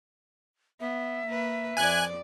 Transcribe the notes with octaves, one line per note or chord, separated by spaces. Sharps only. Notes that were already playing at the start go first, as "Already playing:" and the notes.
B3 E5
A#3 B4
F2 D5 G#5 F#6 G#6